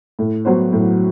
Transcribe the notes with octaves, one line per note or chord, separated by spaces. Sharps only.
A2
F#3 B3 F#4 C5
A2